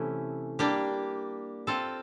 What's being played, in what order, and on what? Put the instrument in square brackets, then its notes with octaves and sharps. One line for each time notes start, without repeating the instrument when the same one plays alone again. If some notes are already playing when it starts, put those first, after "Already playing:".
Already playing: [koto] C3 E3 A3 C#4 E4
G3 A#3 D4 G4
C4 F4 A4